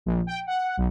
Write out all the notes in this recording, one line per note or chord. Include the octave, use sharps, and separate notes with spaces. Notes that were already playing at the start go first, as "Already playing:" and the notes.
A#1
G5
F#5
B1